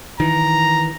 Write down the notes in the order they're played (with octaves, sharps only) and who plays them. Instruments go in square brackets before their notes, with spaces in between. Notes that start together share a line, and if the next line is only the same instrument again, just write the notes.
[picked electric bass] D#3 E3 [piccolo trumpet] A#5